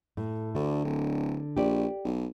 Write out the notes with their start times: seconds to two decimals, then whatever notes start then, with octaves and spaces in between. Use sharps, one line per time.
0.17 A2
0.55 D2 D3
0.84 D1
1.57 A#1 G4 D5
2.04 B1